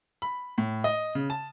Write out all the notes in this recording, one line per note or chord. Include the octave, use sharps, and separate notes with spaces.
B5
A2
D#5
C#3
A5